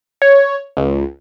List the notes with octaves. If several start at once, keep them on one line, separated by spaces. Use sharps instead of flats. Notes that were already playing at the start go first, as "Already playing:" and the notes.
C#5
C#2